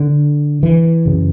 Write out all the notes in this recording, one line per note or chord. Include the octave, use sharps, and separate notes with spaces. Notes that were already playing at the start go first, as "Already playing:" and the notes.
Already playing: D3
E3
F#2 C#3